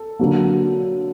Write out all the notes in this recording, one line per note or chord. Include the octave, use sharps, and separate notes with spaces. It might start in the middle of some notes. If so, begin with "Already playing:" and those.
Already playing: A4
D3 F#3 A#3